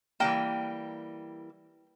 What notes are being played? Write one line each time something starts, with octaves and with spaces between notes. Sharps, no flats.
E3 G3 A#3 G5